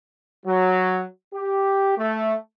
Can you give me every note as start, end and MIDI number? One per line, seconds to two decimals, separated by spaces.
0.46 1.03 54
1.34 1.97 67
1.98 2.34 57